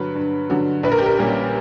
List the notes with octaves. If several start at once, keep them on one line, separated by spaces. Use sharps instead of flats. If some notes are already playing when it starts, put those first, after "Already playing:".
Already playing: G2 D3 F#3 B4
G2
D3 F#3
A#1 B4
A#4
G4
A#4
A#2 G3 A#3 C#4